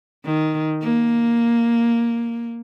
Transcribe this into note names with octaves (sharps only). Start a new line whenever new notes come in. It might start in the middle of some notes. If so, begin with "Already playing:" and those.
D#3
A#3